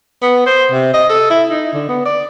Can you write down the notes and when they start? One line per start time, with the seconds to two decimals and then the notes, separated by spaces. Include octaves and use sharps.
0.22 B3
0.46 C5
0.72 C3
0.94 D#5
1.09 A4
1.30 E4
1.50 D#4
1.73 D3
1.89 B3
2.06 D5